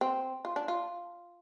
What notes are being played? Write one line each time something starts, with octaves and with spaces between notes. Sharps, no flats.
C4
F4
D4
F4